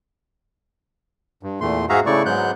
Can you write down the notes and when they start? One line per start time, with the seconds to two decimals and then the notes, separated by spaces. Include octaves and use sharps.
1.43 G2
1.61 E2 A#2 A3 C6
1.89 G#2 F#4 G#4 E5 F5 A#5
2.06 C#3 A3 E4 D5 C#6
2.26 G#2 F#3 G#3 B3 F#6 G6